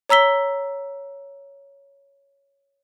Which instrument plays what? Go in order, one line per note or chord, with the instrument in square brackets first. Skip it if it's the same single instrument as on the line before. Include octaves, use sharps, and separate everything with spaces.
[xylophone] C#5 A#5 E6 B6 G7